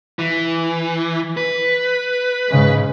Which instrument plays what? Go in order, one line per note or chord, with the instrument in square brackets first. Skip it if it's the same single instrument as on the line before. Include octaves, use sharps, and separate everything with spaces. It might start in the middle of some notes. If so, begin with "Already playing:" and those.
[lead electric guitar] E3
B4
[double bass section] G#2 C#3 G#3